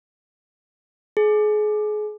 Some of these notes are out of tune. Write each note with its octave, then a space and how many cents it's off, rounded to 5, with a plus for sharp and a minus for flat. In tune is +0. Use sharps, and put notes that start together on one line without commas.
G#4 +30